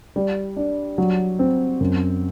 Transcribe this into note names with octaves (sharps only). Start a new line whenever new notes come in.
G3
D4
F#3
C4
F#2